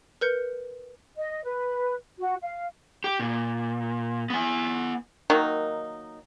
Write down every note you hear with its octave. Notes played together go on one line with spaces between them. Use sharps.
A#4 B4 G6 C#7
D#5
B4
F#4
F5
G4
A#2
B3 G#5
D#3 F#3 A#3 D#4